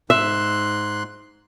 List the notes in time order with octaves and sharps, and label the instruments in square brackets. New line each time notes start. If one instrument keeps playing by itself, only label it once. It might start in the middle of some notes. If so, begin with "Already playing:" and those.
[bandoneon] G#2 C6 F#6 [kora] E5